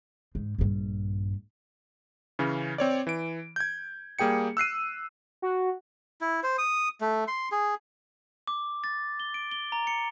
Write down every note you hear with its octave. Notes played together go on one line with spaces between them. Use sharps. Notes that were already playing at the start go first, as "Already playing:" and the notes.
G#2
A#1 G2
C#3 E3 C#4
C4 C#5 D5
E3 D7
G6 G#6
G3 A#3 G#4 G5 C#7
E6 F#6 C7 D#7
F#4
E4
C5
D#6
A3
C6
G#4
D6
A6
G7
D7
G7
A#5
C#7